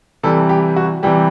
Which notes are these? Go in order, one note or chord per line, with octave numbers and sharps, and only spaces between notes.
C3 E3 G3 A4
G4
F#4
C3 E3 G3 G4